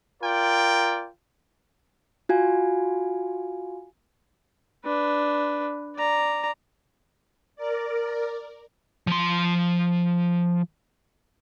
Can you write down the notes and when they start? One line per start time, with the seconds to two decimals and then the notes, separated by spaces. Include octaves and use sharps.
0.21 F4 A#4 D5 G5
2.29 F4 F#4 F5 G#5
4.85 D4 B4
5.96 D5 A#5
7.56 A#4 D5
9.07 F3 C6